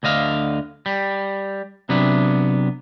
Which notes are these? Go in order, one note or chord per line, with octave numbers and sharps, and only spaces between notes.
D2 D3 D#5 F5
G3
C3 F#3 B3 D4